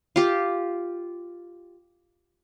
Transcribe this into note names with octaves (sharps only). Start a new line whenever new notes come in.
F4 G4